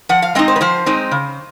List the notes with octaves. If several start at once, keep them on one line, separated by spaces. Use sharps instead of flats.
F3 F#5
F5
G#3 C4 D#4 D#5
C5
B4
F3 C5
G#3 C4 D#4
C#3